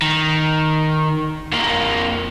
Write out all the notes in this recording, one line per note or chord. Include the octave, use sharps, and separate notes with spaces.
D#3
F2 A#3